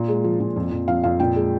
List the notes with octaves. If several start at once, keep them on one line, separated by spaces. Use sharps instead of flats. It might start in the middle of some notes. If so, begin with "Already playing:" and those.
Already playing: A#2
G#3
F3
A#2
F2
F2
F2 F5
F2 F5
A#2 G5
G#3